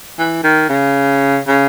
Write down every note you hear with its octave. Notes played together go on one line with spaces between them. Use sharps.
E3
D#3
C#3
C#3